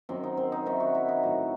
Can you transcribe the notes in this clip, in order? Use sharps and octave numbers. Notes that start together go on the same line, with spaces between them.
F#2 D#3 F#3 C4
D#4
C4
D#4
F#2 D#3 F#3 E4
F#4
E4
D#4
A2 F#3